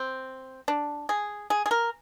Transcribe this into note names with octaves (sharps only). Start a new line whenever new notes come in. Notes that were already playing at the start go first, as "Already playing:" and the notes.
Already playing: C4
D4
G#4
G#4
G#4
A#4